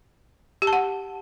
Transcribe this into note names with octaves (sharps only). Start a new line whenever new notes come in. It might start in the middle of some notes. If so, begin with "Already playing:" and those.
G4
A5
F#5